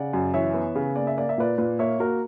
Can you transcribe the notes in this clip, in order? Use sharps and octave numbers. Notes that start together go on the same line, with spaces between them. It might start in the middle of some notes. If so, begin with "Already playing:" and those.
Already playing: C#3 D5 F#5
F#2
E3 C#5 E5
B3
C#3
A#3 D5
E5
A#3 D5
E5
A#2 B4 D5
A#2 B4 D5
A#3 C#5 E5
A#3 F#4 A#4